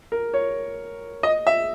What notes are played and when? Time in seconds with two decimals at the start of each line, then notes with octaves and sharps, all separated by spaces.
0.12 A#4
0.34 C#5
1.23 D#5
1.47 E5